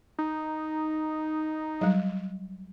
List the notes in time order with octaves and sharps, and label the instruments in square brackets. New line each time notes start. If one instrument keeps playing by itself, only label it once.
[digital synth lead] D#4
[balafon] F#3 G3